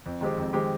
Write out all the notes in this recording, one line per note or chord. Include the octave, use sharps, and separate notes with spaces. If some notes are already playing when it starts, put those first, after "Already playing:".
F2
D#3 G#3 C4 G4
F2
D#3 G#3 C4 G4